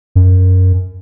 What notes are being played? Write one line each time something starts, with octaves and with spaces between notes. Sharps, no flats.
F#2